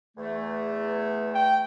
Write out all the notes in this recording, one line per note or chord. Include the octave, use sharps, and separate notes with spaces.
E2 A3
G5